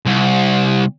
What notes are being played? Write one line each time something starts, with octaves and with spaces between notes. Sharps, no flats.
C2